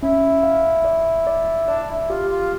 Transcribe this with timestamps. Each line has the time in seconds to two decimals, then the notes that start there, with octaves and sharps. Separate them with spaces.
0.02 C#4 E4
0.43 F5
0.85 D5
1.27 D5
1.67 D4 D5
1.88 E4
2.09 F4 G4
2.30 F4